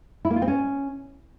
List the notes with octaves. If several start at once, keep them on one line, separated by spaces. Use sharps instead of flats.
E4
A#3
F4
C4
C#4